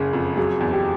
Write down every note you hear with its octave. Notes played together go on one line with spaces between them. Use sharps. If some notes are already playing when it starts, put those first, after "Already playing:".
Already playing: F#1 C#3 G#4
F2
F#3 G#4
E2
G4